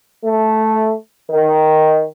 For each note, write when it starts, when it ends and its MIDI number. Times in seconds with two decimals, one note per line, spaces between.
0.24 0.92 57
1.30 2.02 51